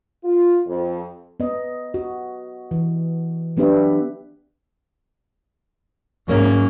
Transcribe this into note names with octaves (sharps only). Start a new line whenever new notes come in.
F4
F2
B3 D#5
F#4
E3
F#3 B3 D4 G4 B4 E5
G#2 F#3 A#3 C#4